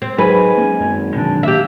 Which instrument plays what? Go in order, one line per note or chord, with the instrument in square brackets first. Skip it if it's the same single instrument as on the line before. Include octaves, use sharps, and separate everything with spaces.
[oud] C4
[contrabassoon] G#2 [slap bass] F#3 [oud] B4 [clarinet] G#5
[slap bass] A#3 C#4
[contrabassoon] G#1 [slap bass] F#2
[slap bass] B2 D#3 F#3 [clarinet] D4
[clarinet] A#3 [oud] G4 E5